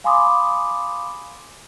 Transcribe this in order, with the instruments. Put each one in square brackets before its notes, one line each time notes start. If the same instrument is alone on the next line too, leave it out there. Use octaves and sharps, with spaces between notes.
[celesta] F5 G#5 B5 C6 D6 D#6